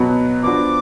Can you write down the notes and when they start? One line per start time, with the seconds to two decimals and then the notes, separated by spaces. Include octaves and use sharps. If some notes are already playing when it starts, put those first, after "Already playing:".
Already playing: B2 F#3 B3
0.42 F3 B3 D4 F#4 D6